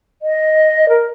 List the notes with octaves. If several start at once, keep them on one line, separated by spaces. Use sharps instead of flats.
D#5
A#4